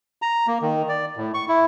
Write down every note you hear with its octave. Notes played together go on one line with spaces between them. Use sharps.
A#5
A#3
D#3
D5
A2
C#6
E4